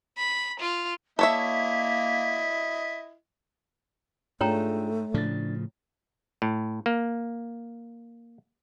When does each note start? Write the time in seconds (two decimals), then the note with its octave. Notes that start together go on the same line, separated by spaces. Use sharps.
0.18 B5
0.60 F4
1.19 A#3 E4 A4 C#5 D#5 E5 B6
4.41 G#2 A3 D4 F4 G#4 C#5 G5 A#5
5.14 A2 C#3 F3 D4 A6
6.42 A2
6.86 A#3